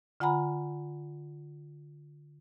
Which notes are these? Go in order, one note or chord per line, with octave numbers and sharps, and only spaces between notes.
D3 F4 F#5 G#5 A#5 B5